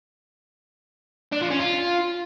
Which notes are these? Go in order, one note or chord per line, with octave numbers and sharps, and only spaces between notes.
D4
F3
C#4
F4